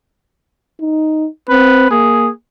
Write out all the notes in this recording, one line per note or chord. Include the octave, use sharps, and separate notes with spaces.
D#4
C4 B4
A#3 G#4